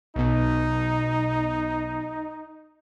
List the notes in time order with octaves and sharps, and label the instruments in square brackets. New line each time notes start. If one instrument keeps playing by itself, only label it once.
[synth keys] B1 B2 [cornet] D#4